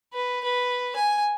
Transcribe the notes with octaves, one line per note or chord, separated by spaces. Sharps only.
B4
B4
G#5